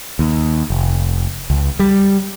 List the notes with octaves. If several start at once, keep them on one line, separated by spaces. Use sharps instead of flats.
D#2
F1
C#2
G3